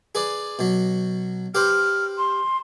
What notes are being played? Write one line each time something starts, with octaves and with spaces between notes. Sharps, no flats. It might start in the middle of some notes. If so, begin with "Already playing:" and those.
G#4 B4 D5
B2 F#3
G4 B4 C5 F6
C6